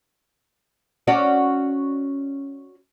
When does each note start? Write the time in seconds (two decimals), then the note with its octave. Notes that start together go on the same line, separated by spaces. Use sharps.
1.07 C#4 F#4 D5